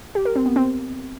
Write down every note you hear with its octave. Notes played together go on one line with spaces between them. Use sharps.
G4
A#4
C4
B3
C4